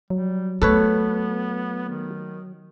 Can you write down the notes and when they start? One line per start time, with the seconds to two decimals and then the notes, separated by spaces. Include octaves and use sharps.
0.10 F#3 G3
0.62 A3 B3 A4 B4 C#5
1.89 D#3